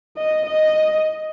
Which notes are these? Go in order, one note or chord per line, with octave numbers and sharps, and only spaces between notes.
D#5
D#5